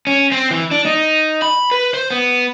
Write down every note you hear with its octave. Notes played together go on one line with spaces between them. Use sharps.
C#4
C4
E3
D4
D#4
B5
B4
C5
B3